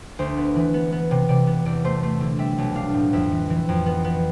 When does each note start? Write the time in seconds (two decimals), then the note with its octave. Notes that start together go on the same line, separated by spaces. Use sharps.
0.19 D2 C5
0.37 B3
0.56 E3
0.74 B3
0.92 B3
1.11 C3
1.29 C3 D5
1.47 B3
1.65 E2 D5
1.84 A3 C5
2.03 A3 C5
2.20 D3
2.39 G3 E5
2.58 B1
2.75 D4 F5
2.94 A2
3.13 F2 E5
3.32 E3
3.50 E3
3.69 F2
3.86 B3
4.05 B3